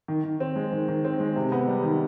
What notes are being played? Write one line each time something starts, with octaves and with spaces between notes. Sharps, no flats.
D#3
D#3
C4
G#3
D#3
D#3
C4
G#3
C3
B3
G3
D#3